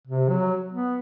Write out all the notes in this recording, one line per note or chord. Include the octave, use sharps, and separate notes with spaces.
C3
F#3
B3